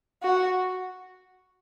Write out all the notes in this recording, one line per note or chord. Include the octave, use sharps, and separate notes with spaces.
F#4